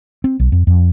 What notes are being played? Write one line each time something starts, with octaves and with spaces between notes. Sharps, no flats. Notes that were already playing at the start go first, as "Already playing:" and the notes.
C4
B1
F2
F2